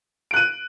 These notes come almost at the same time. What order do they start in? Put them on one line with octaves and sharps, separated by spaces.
D7 F#6 D#7